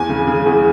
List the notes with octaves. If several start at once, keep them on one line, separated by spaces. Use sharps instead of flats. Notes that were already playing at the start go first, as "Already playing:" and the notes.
Already playing: E2 G#5
C#3
C#3
E2